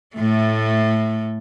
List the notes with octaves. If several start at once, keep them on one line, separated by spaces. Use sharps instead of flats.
A2 A3